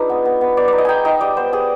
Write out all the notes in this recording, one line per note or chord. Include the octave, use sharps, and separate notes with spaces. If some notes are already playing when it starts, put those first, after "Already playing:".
Already playing: G#3 D4 D#4 F4 B4
B3
B3
B3
B3 D5
D#4 D5
D#5
D#4 G5 G#5
D#4 D#5
G3 D5
B3 C5
G3 G#4